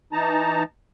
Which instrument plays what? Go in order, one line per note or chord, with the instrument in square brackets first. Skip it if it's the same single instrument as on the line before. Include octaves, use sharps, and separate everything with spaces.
[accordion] E3 D#4 A5 A#5